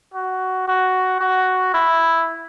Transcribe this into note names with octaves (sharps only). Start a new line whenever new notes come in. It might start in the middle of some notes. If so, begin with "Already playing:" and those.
F#4
F#4
F#4
E4